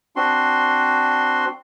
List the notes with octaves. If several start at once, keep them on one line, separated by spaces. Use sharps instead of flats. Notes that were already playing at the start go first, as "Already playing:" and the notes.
C4 D4 F#4 C6